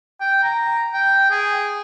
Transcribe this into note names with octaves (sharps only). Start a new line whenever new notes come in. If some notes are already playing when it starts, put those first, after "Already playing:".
G5
A#5
G5
G#4